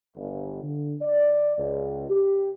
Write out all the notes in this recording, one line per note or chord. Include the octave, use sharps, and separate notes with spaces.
G1
D3
D5
C#2
G4